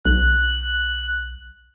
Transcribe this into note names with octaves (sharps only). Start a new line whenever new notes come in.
B1 F#6